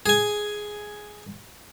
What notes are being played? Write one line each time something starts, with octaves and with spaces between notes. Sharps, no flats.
G#4 G#5